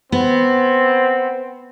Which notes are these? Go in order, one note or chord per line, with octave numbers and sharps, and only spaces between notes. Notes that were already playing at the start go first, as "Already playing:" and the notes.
B3 C4